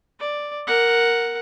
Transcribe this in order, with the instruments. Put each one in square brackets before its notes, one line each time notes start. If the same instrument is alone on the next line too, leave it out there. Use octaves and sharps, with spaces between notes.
[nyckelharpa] D5
A#4 F#5